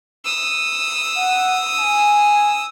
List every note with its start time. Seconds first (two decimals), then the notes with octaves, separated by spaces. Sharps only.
0.25 D#6 E6
1.17 F#5
1.79 G#5